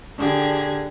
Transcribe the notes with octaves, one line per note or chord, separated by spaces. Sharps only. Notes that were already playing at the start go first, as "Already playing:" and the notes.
D3 G4 G#4 G#6